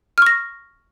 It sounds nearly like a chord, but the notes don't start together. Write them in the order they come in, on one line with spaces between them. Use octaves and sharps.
F6 C#6 A#6